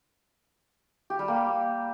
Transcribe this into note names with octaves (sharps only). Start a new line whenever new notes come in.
G4
G3
A#3